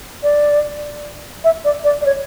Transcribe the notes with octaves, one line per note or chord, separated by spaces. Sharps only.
D5
E5
D5
D5
D5
C#5